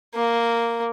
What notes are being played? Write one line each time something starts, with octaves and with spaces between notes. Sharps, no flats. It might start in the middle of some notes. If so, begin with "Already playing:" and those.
A#3